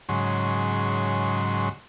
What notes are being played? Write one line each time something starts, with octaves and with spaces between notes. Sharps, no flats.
G#2 C#3 F#3 C6